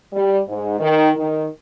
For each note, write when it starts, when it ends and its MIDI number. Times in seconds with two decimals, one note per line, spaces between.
0.13 0.40 55
0.48 0.77 44
0.79 1.09 51
1.17 1.46 51